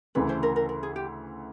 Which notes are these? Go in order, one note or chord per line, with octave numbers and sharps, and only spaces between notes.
D2 C#3 E3 A3 B4
C5
A#4
A#4
A#4
G#4
G4